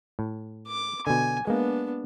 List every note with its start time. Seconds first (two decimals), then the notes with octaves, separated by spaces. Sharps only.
0.19 A2
0.68 D6
1.07 B2 D3 G#5
1.47 G#3 A#3 B3 D4